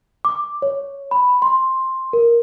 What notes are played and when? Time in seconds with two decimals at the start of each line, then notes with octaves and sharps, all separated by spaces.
0.25 D6
0.62 C#5
1.11 B5
1.42 C6
2.13 A#4